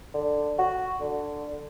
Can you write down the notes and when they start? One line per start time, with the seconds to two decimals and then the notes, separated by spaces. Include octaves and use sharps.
0.14 D3
0.59 F#4
1.00 D3